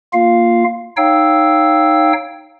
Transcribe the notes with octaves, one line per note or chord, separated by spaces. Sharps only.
A#3 F4 F5
D#4 C#5 F5 G5 E6